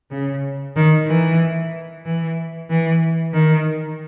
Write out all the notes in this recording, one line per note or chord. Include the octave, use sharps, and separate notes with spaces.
C#3
D#3
E3
E3
E3
D#3